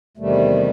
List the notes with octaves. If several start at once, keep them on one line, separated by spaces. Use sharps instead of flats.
E2 C3 D#3 G3 A3